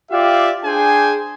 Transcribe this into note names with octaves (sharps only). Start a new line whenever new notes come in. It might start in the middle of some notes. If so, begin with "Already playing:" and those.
F4 G4 D5 E5 F5
D4 G#4 C5 G5 G#5